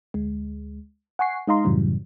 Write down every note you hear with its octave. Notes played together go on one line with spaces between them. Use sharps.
D2 G#3
F#5 G#5 C#6 C7
G#3 D#4 D#5 F5 A#5 C6
F#2 A2 C#3 E3 F#3 G3